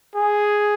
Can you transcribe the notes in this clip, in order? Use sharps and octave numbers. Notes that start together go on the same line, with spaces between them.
G#4